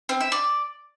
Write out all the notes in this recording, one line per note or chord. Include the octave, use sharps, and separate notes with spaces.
C4
E5
D5